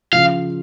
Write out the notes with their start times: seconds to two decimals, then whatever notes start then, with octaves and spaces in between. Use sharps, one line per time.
0.12 C#3 F3 F5